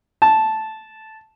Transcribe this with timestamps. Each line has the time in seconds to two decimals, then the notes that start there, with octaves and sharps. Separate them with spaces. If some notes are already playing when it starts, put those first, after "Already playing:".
0.22 A5